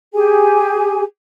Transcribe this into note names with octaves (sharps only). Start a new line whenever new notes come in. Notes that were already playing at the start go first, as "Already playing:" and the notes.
G4 G#4 G#5